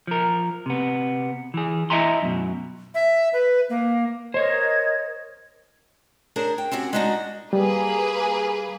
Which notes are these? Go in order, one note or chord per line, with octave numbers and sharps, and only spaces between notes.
F3 A#4
C3 B3
E3 G#4
E4 D#5 E5 G#5 A#5 C6
F#2 B2
E5
B4
A#3
A#4 C5 C#5 D#5 G#6
D4 G#4 A#4 C5 C#5
G5
C4 C#4 F#4 G4
G#3 B3 D4 D#4 F#4
G3 A#3 G#4 B4